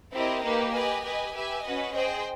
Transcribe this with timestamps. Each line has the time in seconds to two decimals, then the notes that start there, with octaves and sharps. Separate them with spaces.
0.12 C4 E4 G4 A#4 D#5
0.43 A#3 D#4 G4 B4
0.72 G4 B4 D#5 G#5
1.03 G4 B4 D#5 G#5
1.33 G4 B4 E5 G#5
1.63 C#4 F#4 B4 D#5
1.93 G#4 C5 D#5 G5